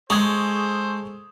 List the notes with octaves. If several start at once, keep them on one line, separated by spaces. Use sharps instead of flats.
G#3 G#4 A4 C5 C#6 D#6 G#6